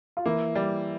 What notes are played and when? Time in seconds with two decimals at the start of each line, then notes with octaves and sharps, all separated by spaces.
0.17 F4
0.25 E3 A#3 E4
0.55 G3